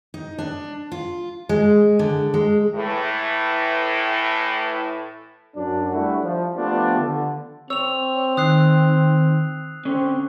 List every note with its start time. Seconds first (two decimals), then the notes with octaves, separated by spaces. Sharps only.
0.14 D#4
0.38 D4
0.92 F4
1.49 G#3
1.99 D3
2.34 G#3
2.75 A2 E3
5.55 F#2 D4
5.90 G3 A3 D4 E4 F#4
6.23 F3
6.55 F3 A3 B3 D4 F4 G4
6.97 D3
7.70 C4 C#5 E6 F7
8.37 D#3 D#6 F#6 C7
9.85 D3 C4 C#4